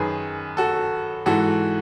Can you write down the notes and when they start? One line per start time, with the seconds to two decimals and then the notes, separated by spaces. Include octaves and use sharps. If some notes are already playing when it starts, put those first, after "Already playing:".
Already playing: F#2 D#3 G#4 B4
0.57 F#4 A4
1.26 G#2 E3 F#4 A4